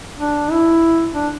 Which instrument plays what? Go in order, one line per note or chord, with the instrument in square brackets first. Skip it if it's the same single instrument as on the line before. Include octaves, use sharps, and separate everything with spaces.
[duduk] D4
E4
D4